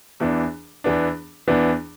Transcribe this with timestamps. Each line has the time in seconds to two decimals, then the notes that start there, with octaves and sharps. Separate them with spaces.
0.20 E2 E3 B3 D4
0.84 E2 E3 B3 D4
1.48 E2 E3 B3 D4